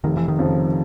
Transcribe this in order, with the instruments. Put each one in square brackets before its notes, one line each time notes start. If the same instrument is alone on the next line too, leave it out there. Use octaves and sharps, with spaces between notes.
[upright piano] F1 [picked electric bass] D#3
[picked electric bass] E3
D#3
[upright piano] F2 C#3 F3